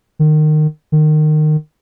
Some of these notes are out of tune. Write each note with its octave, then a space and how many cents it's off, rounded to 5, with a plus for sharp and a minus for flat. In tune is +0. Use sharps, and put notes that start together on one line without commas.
D#3 -25
D#3 -25